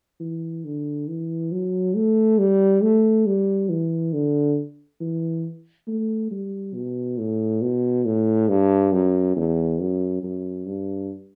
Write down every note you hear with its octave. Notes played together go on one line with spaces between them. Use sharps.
E3
D3
E3
F#3
A3
G3
A3
G3
E3
D3
E3
A3
G3
B2
A2
B2
A2
G2
F#2
E2
F#2
F#2
G2